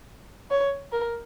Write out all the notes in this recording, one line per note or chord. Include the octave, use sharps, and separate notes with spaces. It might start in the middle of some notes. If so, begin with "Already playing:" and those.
C#5
A#4